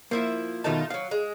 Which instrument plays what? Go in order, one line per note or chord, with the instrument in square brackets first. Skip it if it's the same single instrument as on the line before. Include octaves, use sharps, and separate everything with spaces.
[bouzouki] F3 E4 E5 [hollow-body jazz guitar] A#3
[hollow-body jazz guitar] B2 D#3 A5 [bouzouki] A3 D#4 F4
[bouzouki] F3 F#3 [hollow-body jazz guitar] F5
[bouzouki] G#3